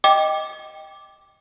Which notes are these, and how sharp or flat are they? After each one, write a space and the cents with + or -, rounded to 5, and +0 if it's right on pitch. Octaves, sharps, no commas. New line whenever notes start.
D#5 +0 G5 +0 D6 +0